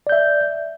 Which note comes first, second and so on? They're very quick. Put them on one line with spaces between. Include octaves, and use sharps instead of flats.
D5 G6 E5